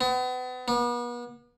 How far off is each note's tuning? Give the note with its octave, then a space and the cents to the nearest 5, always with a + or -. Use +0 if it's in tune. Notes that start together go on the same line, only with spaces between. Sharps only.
B3 +35
B3 -40